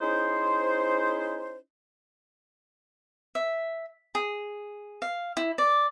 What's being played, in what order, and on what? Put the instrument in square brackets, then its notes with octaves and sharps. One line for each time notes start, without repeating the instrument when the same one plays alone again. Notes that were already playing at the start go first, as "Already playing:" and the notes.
[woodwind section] C#4 D#4 E4 G#4 C5
[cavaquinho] E5
G#4
F5
E4
D5